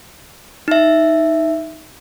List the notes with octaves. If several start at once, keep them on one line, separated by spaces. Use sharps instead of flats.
D#4 E5